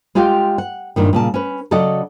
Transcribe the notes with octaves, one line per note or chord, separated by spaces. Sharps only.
G#3 F4 G4 F5 G5
F#5
G2 A#2 D#3
A#2 C#3 A5
C#4 B4
C#3 F#3 A4 D5 D#5 F#5